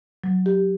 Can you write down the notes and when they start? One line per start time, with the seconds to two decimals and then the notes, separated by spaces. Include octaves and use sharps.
0.24 F#3
0.46 G4